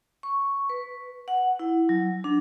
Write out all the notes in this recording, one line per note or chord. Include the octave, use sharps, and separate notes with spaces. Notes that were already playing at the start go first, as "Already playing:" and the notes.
C#6
B4
F#5
E4
F#3
D4